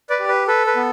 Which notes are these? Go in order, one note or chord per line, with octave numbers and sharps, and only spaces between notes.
B4 D5
G4
B4
A4 B4
B4
B3